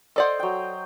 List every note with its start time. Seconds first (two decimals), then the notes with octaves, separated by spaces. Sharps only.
0.16 A4 C5 D5 D#5 F#5
0.39 F#3 G5